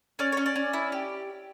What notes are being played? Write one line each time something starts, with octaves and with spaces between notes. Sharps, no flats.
C#4 D5
C#4 C#5
D5
C#4
E4
G4